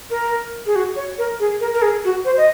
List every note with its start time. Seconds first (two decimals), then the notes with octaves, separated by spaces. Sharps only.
0.10 A#4
0.66 G#4
0.76 F#4
0.96 C#5
1.18 A#4
1.40 G#4
1.60 A#4
1.74 A#4
1.82 G#4
2.05 F#4
2.25 C5
2.37 D#5